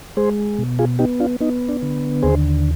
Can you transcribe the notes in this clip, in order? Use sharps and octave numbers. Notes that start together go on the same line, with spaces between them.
G#3 G#4 C5
B2
F4 G#4
B3 D#4 G4
D4 F4
B3 D#4
D4
D3
D#2 G#4 C5